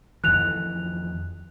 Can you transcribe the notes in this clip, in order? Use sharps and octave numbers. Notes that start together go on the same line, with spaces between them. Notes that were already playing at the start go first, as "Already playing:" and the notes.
F2 D#3 E3 F#6 F7